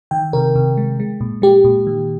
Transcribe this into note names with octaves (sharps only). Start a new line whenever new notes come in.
D#3 G5
C3 A#4
C3
G#3
G#3
A#2
G#3 G4
A#2
D#3